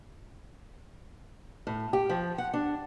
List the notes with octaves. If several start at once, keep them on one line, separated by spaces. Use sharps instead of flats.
A2
G4
F3
F#5
D4